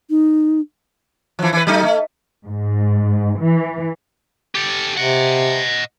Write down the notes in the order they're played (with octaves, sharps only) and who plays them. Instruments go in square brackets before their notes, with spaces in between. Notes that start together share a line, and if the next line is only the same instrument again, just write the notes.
[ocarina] D#4
[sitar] E3 F3
E3 B4
F#3 A3 D#4
A3
[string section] G#2
E3
[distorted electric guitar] G4 A4
[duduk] C3 [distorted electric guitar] D#5 F#5